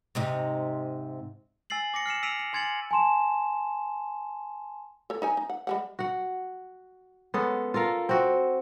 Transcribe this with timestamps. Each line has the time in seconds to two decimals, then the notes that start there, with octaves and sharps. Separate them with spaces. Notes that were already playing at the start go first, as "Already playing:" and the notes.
0.15 G#2 C3 D#4
1.70 G#5 E6 A6 C7 F#7
1.94 D6 A#6 C#7
2.06 F6 C7 C#7 E7
2.23 E6 B6 C7 D7 D#7 F7
2.39 C#7
2.53 G#5 C6 G#6 A6 C#7 F#7
2.91 G#5 A5 C6 E7
5.10 A4 C#5
5.22 D#4 C#5 G#5
5.37 D#4
5.50 F#5
5.67 G3 G#3 F#5
5.99 F#4 F#5
7.34 G#3 B3 C#4 A4
7.74 F4 A4 A#4 F5
8.09 C4 F#4